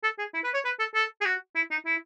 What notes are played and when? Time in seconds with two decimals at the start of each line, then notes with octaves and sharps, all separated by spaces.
0.04 A4
0.19 G#4
0.34 E4
0.44 B4
0.54 C#5
0.65 B4
0.80 A4
0.95 A4
1.21 G#4
1.25 F#4
1.56 E4
1.71 D#4
1.86 E4